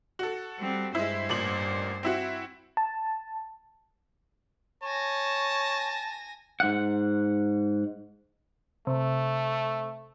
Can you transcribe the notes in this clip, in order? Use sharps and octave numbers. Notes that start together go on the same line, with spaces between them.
F#4 A4
G3 C4
G2 G#3 E4 C5
A1 A#2 F#7
C4 E4 F#4
A5
C#5 G#5 A5 A#6
G#2 F#5
C3 A3